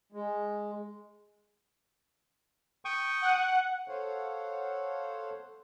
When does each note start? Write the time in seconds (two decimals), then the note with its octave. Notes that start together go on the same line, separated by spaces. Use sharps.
0.12 G#3
2.85 G5 C#6 D#6
3.21 F#5
3.88 A4 C5 C#5 F5 F#5